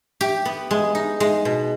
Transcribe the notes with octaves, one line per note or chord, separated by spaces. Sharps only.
G4
B3
G#3
D#4
G#3
B2